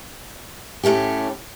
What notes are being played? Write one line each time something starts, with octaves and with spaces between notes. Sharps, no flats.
A2 A3 C#4 G4